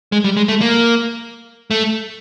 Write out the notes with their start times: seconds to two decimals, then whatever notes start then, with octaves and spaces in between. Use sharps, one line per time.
0.12 G#3
0.24 G3
0.37 G#3
0.48 A3
0.61 A#3
1.71 A3